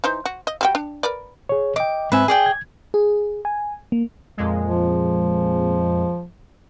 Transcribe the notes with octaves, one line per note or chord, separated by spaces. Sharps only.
E3 D#4 C5
F#4
D#5
G3 F#4 G5
D4
A#4 B4 D5
G#4 C#5
D#5 G5 D6
G#2 C4 B4 E5 G#5
G#4 D5 G5 G#5
G#6
G#4
G#5
A#3
F2 A#2 G#3
F3